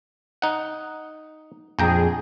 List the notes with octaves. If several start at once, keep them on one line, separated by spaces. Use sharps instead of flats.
D#4 F#5
A#1 F2 G#4 G5 A#5